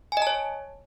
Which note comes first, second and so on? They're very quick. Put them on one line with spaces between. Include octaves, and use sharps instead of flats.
G#5 D#5 A5 C#5